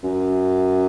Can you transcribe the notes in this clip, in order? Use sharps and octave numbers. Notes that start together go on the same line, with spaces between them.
F#2